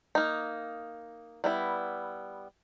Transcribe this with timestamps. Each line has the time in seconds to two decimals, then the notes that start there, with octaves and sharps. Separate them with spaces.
0.15 A#3 D#4
1.44 G3 B3 E4